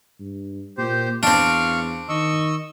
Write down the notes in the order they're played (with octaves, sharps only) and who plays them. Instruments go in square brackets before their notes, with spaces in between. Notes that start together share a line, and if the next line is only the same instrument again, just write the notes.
[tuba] G2
[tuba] A#2 [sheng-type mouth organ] G4 C5
[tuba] E2 [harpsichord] C4 D4 [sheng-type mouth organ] F5 C#6 F6
[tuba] D#3 [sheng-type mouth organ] D#5 C#6 E6